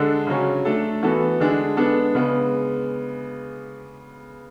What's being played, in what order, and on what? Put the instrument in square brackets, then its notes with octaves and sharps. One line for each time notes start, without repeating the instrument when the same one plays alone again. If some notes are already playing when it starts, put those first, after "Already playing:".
Already playing: [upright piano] D3 G#3 D4 A4
C#3 F#3 C#4
A3 D4 A4
E3 B3 F#4 A4
D3 G#3 D4 G#4
G#3 B3 D4 A4
C#3 G#3 B3